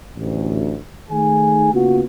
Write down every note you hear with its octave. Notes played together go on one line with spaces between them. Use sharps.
A1 D2
D#3 A3 D#4 G#4 G#5
C#3 A#3 B3 F4 F#4